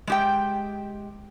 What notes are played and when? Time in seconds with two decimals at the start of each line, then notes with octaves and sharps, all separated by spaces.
0.07 G#3 G4 G5